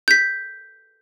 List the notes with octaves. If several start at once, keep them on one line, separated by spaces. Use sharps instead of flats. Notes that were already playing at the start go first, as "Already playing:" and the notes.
G6 B6